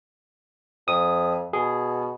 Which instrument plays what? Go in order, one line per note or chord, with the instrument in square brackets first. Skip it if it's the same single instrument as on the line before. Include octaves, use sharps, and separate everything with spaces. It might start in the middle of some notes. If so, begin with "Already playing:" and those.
[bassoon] F2 [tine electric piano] D#6
[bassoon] B2 [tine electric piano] G#4